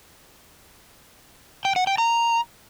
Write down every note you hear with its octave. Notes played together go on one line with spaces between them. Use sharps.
G5
F#5
G5
A#5